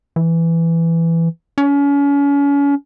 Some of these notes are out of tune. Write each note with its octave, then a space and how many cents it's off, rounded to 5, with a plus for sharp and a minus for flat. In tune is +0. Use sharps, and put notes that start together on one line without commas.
E3 +10
C#4 +35